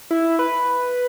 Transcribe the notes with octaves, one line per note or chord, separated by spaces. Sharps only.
E4
B4